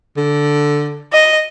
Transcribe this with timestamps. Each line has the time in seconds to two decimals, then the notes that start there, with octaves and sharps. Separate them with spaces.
0.17 D3
1.13 D#5